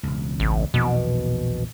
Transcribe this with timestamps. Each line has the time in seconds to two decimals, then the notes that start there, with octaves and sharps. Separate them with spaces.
0.03 E1 C#2
0.40 A1
0.74 A#1 E2 B2 D#3